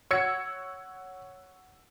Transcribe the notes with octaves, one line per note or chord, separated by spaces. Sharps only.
C#5 F#5 E6 G#6 C#7